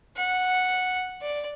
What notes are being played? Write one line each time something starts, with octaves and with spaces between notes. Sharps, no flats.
F#5
D5